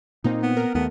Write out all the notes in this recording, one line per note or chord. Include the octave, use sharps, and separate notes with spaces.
A#2 A#3 C4 D#4
B3
A#4
D#2 A3 B3